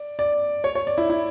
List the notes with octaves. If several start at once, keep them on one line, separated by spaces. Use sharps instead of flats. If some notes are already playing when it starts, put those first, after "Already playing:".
Already playing: D5
D5
C#5
C#5
D5
E4
E4